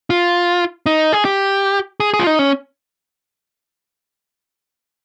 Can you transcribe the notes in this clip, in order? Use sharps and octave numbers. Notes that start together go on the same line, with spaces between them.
F4
D#4
G#4
G4
G#4
G#4
F4
D#4
C#4